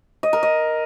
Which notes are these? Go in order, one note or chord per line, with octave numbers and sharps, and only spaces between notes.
D#5
A#4
D#5